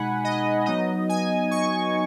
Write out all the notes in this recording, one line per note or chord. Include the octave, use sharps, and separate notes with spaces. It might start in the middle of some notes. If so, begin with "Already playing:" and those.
Already playing: B2 G#3 D#4 F#5 G#5 B5
D#5
F#3 B3 D#4 D#5
G#5
C#6